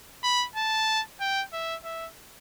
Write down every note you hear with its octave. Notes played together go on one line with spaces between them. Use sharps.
B5
A5
G5
E5
E5